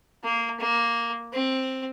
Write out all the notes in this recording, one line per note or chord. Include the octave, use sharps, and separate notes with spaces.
A#3
A#3
C4